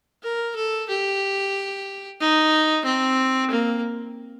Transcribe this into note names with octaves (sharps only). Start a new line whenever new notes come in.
A#4
A4
G4
D#4
C4
A#3